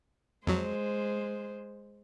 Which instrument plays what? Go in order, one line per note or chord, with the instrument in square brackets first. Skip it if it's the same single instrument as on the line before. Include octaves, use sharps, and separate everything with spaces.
[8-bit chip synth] F2 F#3 [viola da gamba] G#3 C5